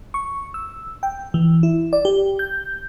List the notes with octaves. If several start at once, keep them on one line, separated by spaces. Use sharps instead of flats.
C#6
E6
G5
E3
E4
D5
G4
G6